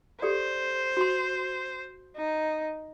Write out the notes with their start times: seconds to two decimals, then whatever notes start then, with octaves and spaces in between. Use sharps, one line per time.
0.22 G4 A4 C5 D5
0.97 F#4 C6
2.17 D#4